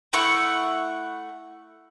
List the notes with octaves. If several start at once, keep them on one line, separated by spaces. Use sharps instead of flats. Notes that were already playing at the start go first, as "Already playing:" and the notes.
A3 E4 F#5 C#6